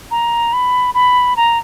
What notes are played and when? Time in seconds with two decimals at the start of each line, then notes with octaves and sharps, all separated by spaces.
0.11 A#5
0.53 B5
0.94 B5
1.36 A#5